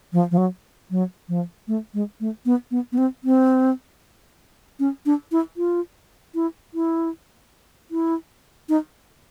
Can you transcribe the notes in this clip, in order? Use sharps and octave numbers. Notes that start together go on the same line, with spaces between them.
F3
F3
F#3
F#3
F3
A3
G#3
A3
B3
B3
B3
C4
C4
C#4
D4
E4
F4
E4
E4
E4
D#4